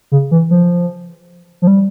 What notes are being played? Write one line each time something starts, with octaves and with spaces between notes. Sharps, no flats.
C#3
E3
F3
F3
G3